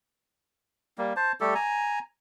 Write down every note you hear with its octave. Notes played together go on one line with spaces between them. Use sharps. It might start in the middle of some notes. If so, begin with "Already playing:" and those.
G3 A#3
C5 A5
G3 A3 G4 A4
G#5 A#5